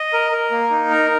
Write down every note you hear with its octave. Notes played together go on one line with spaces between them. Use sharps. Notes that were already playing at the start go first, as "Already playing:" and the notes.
Already playing: D#5
A#4
A#4
A#3
D#4
A#4